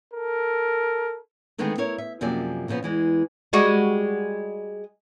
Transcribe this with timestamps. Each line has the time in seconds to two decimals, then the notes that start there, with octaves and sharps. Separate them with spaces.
0.14 A4 A#4
1.58 D3 D#3 G#3 A3 B3 C4
1.78 E4 A#4 C#5
1.98 E5
2.21 F#2 C3 F3 A#3 G#4 D5
2.68 A#2 C#3 F3 B3
2.83 E2 E3 G#3
3.53 G3 G#3 F#4